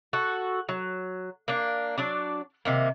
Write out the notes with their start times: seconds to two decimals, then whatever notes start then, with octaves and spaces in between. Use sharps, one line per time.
0.13 F#4 A4
0.69 F#3
1.48 A#3 D4
1.98 F#3 D4 D5
2.65 C3 D#3 A#3